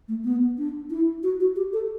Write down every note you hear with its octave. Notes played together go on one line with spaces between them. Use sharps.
A3
B3
D4
E4
F#4
F#4
G4
A4